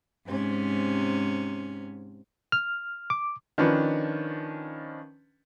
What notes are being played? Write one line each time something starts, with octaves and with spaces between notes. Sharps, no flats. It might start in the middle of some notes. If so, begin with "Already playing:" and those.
G#2 C3 C#4
F6
D6
D#3 F3 C#4 D4 B4